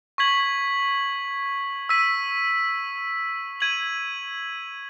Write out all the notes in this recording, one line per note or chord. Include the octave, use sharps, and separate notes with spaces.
C#6 G#6 B6 F#7
E6 B6 D#7
G#6 D#7 F#7